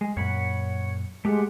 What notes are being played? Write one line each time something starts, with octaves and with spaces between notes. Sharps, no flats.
G#3
F#2 A#2 C#5 F#5 B5
G#3 A3 G4 F#5